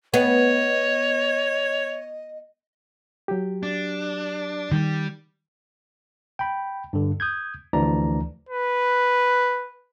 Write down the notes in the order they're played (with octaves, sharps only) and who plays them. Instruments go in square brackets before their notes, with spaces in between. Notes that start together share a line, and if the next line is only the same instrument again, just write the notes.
[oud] B3 [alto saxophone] C#5 [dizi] D#5
[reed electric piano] F#3 G4
[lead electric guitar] D4
[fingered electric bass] D#3 [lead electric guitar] G3
[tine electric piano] G5 B5
G2 D3
D#6 G6 G#6
D2 E3 F3 D4 D5 A#5
[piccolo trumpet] B4